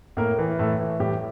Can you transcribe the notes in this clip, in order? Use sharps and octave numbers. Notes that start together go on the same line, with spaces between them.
A2 A#3 A#4
E3
A2 A3 A4
E3
A2 G3 G4